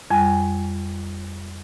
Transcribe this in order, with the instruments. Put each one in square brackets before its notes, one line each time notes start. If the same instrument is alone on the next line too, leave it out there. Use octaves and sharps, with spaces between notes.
[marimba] F2 G3 G#5